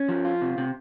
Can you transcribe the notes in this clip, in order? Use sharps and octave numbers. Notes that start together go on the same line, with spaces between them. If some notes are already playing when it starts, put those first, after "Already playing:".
Already playing: C#4
F3
F4
C3
C3